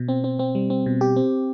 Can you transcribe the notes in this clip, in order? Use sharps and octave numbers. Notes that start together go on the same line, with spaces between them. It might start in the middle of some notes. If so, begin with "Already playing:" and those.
Already playing: B2
C4
C4
C4
G3
C4
B2
G4
C4